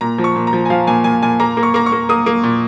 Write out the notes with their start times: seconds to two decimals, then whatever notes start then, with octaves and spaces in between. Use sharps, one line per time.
0.01 A#2 A#5
0.18 F3
0.24 C#6
0.36 A#2
0.47 A#5
0.53 F3
0.65 G#5
0.70 F3 F5
0.87 A#2 G#5
1.04 A#2 G#5
1.23 A#2 G#5
1.40 A#3 A#5
1.57 A#3
1.63 C#6
1.74 A#3 A#5
1.86 C#6
1.92 A#3
2.09 A#3 D#6
2.26 A#3
2.44 A#2